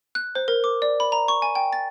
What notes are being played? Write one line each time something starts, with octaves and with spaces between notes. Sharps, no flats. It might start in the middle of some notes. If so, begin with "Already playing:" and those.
F#6
C5
A#4
D6
D5
B5
A#5
C#6
G#5
G5
A6